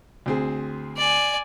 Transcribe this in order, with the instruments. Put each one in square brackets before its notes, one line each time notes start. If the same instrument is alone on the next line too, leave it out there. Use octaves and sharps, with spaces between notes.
[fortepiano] D2 C4 G#4
[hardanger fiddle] D5 G#5